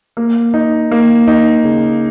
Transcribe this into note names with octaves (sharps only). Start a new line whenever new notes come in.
A#3
D#4
A#3
D#4
C#3